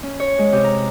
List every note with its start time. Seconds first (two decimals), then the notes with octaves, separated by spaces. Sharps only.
0.03 C#4
0.20 C#5
0.39 G#3
0.52 C3
0.64 A#5